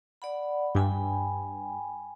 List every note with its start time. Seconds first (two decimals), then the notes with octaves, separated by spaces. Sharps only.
0.22 D5 F#5 B5
0.75 G2 G5 G#5 B5